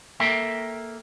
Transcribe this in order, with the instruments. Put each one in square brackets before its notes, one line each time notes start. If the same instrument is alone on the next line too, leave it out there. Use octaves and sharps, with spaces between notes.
[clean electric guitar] A#3 A4 A#4 E5 G5